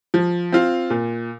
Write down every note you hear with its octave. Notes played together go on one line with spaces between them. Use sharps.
F3
C4 F4
A#2